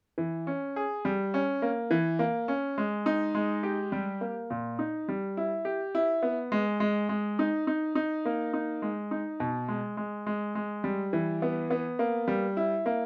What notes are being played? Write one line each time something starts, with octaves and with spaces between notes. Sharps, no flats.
E3
C#4
G#4
G3
C#4
A#3
E3
A#3
C#4
G#3
D#4
G#3
G4
G3
A#3
A#2
D#4
G3
E4
G4
E4
B3
G#3
G#3
G#3
D#4
D#4
D#4
A#3
D#4
G#3
D#4
B2
G#3
G#3
G#3
G#3
G3
E3
B3
B3
A#3
G3
E4
A#3